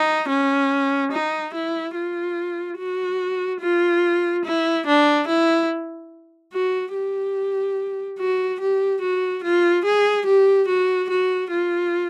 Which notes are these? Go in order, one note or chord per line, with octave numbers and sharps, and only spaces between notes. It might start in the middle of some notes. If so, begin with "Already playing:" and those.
Already playing: D#4
C#4
D#4
E4
F4
F#4
F4
E4
D4
E4
F#4
G4
F#4
G4
F#4
F4
G#4
G4
F#4
F#4
F4